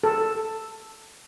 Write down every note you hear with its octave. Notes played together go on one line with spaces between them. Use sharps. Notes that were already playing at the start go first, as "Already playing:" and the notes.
A4